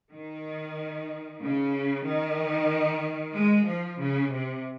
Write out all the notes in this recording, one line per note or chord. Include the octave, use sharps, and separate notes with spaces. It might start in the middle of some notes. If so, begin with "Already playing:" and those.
D#3
C#3
D#3
G#3
F3
C#3
C3